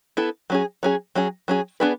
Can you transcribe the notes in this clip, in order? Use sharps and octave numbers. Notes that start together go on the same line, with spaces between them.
B3 E4 A4
F#3 C#4 G#4
F#3 C#4 G#4
F#3 C#4 G#4
F#3 C#4 G#4
B3 D4 G#4 B4